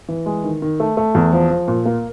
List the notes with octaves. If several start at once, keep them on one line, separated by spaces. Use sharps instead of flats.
E3
G#3
D#3
D#3
A3
A3
E2
F3
F3
A#2
A#3